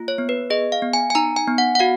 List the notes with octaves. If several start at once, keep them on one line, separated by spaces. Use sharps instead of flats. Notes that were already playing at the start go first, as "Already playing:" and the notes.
Already playing: A#3 F4
C#5
B3
B4
G#4 D#5
F5
B3
G#5
G#5
D#4 A#5
G#5
B3
F#5
F#5
F#4 F5